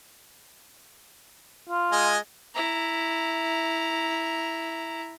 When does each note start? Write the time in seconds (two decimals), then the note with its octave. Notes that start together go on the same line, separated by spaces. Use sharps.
1.69 F4
1.92 G#3 D#5 G#5
2.55 E4 A#5